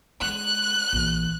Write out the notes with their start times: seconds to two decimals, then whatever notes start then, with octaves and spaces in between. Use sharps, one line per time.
0.21 G#3 F#6
0.93 A#1 E3